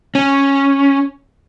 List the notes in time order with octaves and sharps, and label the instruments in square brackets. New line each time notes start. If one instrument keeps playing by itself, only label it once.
[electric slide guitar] C#4